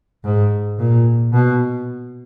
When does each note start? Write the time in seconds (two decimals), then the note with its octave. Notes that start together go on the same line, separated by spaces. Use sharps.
0.24 G#2
0.79 A#2
1.33 B2